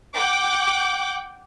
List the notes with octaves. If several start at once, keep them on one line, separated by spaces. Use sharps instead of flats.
F#5 G5 D6